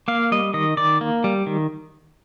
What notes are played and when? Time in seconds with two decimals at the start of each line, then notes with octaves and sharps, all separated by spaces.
0.08 A#3 F5
0.32 G3 D#5
0.54 D#3 D#5
0.77 D#3 D5
1.01 A#3
1.24 G3
1.46 D#3